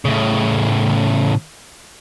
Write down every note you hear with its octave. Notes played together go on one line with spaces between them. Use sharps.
A2 C#3